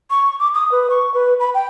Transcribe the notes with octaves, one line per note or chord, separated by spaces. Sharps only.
C#6
D6
D#6
B4
C#6
B4
B5
G5